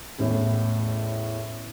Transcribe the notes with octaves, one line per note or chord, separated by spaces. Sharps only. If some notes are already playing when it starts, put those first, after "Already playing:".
A1 E2 A2